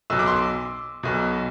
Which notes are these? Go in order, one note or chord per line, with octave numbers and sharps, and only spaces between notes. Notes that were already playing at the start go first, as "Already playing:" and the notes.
B1 B2 E6
D6
C6
D6
B1 B2